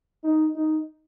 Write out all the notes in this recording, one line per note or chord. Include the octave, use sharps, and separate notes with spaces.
D#4
D#4